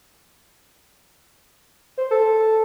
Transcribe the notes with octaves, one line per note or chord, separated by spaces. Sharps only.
C5
A4